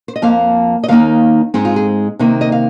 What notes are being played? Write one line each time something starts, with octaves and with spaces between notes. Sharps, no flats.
C5
D#5
F2 F3 A#3 F5
D#5
D#2 D#3 A#3 D#4 F5
G#2 G#3 C4 D#4
F4
G#4
C3 D#3 A#3 D#4
D#5
F5